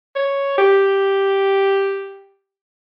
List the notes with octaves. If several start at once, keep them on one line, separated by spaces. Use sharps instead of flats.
C#5
G4